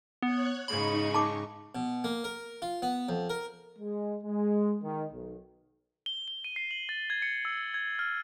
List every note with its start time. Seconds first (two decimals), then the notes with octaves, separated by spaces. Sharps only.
0.23 B3 C#5 F#6 G#6
0.68 G#2 C#3 D#4 B5 C#6
1.14 A5 D6
1.75 B2
2.04 A#3
2.24 A#4
2.62 F4
2.82 B3
3.09 F2
3.30 A#4
3.79 G#3
4.23 G#3
4.83 D#3
5.13 B1
6.06 G7
6.28 G7
6.44 D#7
6.56 C7
6.71 F#7
6.89 A6
7.10 G#6
7.22 C#7
7.45 E6
7.74 G#6
7.99 F6